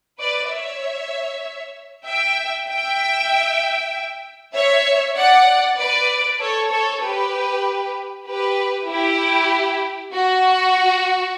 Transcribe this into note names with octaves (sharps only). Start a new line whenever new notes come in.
B4 D5
C#5 E5
E5 G5
E5 G5
C#5 E5
D5 F#5
B4 D5
A4 C#5
A4 C#5
G4 B4
G4 B4
E4 G4
F#4